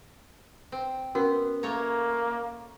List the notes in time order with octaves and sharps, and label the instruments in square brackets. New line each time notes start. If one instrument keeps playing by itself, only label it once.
[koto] C4
[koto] B3 [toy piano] C#4 F#4 A#4
[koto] A3 C#5 A#5 [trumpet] A#3